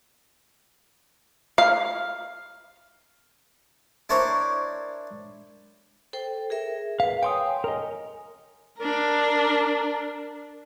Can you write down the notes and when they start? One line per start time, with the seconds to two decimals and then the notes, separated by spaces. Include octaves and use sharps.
1.58 F5
4.09 D4 E4 A#4 C5 C#5
6.13 A4 C5 G5
6.50 G#4 A#4 E5
7.00 B4 F5
7.23 C#5 G5 G#5 C6 D#6
7.64 A#4 D#5
8.79 D4 A#4